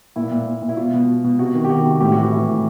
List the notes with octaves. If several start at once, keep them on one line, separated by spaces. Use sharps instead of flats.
A#2 E4
A#2
A#2
A#2
E4
B2 F4
B2
B2
B2
C3 F#4
D#3
G4
D#3 F#4
C3
A2 G4
E3 F#4
G4
E3
A2